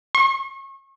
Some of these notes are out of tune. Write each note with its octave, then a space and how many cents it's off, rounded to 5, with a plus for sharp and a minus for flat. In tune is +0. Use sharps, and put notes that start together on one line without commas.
C#6 -35